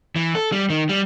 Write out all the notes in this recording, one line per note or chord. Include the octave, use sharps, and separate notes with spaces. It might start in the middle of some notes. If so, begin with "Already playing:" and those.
E3
A4
G3
D#3
G3